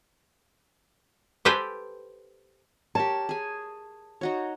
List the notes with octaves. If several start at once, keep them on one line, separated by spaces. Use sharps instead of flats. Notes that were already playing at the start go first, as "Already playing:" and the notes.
G4 A4 B4 C5 G5 G#5
G4 A#4 C#5 A5
G#4 G#5
D#4 F#4 C#5